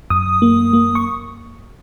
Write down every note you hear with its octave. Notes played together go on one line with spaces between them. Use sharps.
F#2 D#6
A#3
A#3
C#6